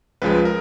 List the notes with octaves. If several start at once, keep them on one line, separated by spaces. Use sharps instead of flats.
C#2 C#3 F3 G#3 B4
A#4